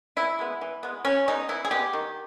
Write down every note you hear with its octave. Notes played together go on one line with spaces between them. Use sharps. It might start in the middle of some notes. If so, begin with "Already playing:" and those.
E3 E4
G#3 B3
E3
G#3 B3
E3 C#4
G#3 B3 D#4
E3 E4
G#4
G#3 B3 G4
D#3